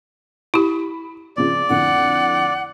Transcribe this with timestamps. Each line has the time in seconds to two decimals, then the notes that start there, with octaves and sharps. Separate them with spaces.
0.54 E4 G4 B5
1.37 C#3 F3 C4 D5
1.69 F2 A2 D3 F#5